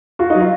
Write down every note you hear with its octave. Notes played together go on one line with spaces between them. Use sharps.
F4 F#4
D#4
F#3
F4